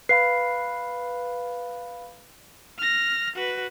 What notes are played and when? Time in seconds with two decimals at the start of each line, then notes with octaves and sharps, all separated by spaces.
0.09 B4 F5 B5 C7
2.78 F6 A#6
3.36 F#4 B4